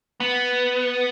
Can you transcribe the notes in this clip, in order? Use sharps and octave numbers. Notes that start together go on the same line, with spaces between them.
B3